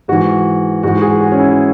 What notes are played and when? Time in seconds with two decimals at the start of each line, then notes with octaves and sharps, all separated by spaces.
0.08 G#2 E3 F#4
0.83 G#2 E3 F#4
1.02 G#4
1.20 F#4
1.32 C#4
1.39 E4